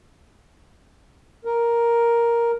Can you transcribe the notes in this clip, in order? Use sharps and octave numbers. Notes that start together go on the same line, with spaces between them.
A#4